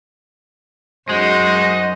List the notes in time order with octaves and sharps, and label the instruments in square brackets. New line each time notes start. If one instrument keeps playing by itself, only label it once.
[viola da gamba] F#2 D#4 [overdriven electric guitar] G#3 [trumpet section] F#4 C5 D#5